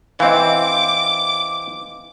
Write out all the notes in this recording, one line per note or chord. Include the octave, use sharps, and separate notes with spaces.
E3 C4 D#5 F5 D6